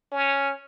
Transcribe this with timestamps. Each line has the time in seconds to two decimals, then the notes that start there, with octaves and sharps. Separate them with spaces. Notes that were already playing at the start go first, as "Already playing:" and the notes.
0.12 C#4